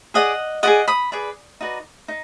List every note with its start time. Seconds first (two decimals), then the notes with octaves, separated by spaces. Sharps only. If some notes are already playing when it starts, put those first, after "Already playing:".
0.14 G#4 D5 D#5 F#5
0.63 G#4 B4 D5 D#5 F#5
0.88 B5 D#6
1.12 G#4 B4 D5
1.61 D#4 F#4 B4 D5
2.08 D#4